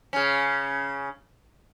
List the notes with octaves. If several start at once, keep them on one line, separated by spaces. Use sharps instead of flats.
C#3 C#4